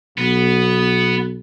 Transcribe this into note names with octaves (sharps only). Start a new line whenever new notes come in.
B1 B3